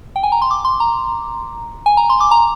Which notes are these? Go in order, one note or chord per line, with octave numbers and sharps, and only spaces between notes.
G5
G#5
A#5
C6
D6
C6
A#5
G#5
A#5
C6
D6
A#5